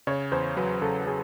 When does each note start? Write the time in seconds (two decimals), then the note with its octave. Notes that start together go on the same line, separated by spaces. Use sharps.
0.07 C#3 C#5
0.32 E2 C5
0.57 F#3 B4
0.81 C#3 A4
1.06 F#3 G#4